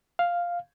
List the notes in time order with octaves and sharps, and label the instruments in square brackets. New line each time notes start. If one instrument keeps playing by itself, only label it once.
[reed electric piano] F5